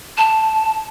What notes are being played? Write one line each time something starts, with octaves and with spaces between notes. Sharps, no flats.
A5